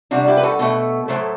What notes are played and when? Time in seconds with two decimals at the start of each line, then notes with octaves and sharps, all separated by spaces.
0.11 C3 G3 D4 F#4
0.27 E4 G4
0.37 B4
0.43 F#4 A4
0.59 B2 A3
1.08 A2 F#3 A3 A4 C5